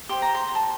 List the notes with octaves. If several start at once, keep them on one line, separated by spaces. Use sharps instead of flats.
G4 C5 C6
A#5
C6
A5